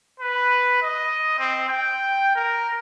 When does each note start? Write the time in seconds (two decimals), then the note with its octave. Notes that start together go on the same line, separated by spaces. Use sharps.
0.20 B4
0.82 D#5
1.39 C4
1.69 G5
2.35 A#4